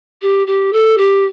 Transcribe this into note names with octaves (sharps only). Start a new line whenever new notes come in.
G4
G4
A4
G4